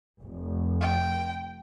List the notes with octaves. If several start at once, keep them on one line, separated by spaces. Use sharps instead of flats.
F1
G5